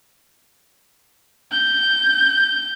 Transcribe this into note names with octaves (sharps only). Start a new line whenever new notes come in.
G6